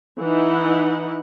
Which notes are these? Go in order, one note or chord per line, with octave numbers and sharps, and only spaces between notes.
E3 D#4 E4 F#5